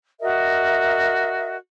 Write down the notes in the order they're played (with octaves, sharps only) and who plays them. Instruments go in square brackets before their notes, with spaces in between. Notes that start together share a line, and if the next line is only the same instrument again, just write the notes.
[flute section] F#4 A#4 D#5 E5